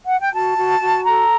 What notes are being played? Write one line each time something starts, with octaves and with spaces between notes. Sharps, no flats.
F#5
G5
F#4 A5
F#4
F#4
A4 A#5